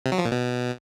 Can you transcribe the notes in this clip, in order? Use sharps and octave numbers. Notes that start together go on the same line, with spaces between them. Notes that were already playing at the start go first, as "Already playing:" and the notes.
C3
F#3
F3
A#2
B2